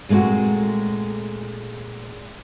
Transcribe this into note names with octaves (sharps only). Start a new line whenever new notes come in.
A#2 G#3 A3 C4 F#4